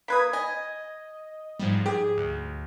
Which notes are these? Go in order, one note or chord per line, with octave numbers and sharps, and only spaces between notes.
A#3 B4 D#6 G#6 B6
D#5 G#5
G#2 F3 G3
G4 G#4
D2